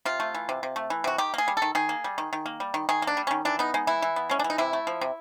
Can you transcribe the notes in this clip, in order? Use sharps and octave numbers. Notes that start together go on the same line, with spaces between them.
C3 F4
A3
E3
C3
C3
A3
E3
C3 F#4
D#3 G4
A#3 G#4
G3
A4
D#3
D#3 G#4
A#3
G3
D#3
D#3
A#3
G3
D#3
D#3 G#4
A#3
D4
G3
D#3 C#4
E3 D4
B3 D#4
G#3 D#4
E3 E4
E3
B3
G#3 C#4
D4
E3
D#4
C3 E4
A3
F3
C3